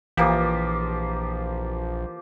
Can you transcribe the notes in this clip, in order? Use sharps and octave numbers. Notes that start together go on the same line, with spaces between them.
A#1 E3 F3 A#3 G4